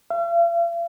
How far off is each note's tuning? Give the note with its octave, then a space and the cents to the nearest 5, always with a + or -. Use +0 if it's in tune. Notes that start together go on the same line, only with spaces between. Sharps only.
F5 -45